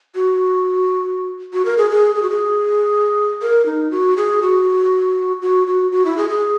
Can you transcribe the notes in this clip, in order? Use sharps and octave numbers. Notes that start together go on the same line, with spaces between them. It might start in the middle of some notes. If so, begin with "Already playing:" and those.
F#4
F#4
A#4
G#4
G#4
G#4
F#4
G#4
A#4
D#4
F#4
G#4
F#4
F#4
F#4
F#4
E4
G#4
G#4